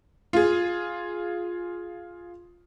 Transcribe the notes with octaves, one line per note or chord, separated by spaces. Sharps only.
F4 G#4